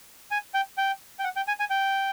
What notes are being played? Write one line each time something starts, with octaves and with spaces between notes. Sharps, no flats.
G#5
G5
G5
G5
F#5
G5
G#5
G#5
G5